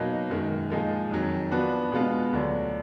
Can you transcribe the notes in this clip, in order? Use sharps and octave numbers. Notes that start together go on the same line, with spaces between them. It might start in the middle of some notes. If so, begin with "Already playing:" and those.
Already playing: B2 F#3 A#3 D#4
F#2 D#3 G#3
A#2 F3 G#3 D#4 G#4
F2 D#3 F#3
F3 B3 D4 F#4 B4
B2 G#3 B3 F4
D2 D3 F#3 D4